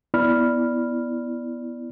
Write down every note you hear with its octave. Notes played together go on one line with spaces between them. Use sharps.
B3 E4 D5 B5 F6